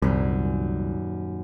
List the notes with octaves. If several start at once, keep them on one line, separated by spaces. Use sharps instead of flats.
D#1 C2 F#2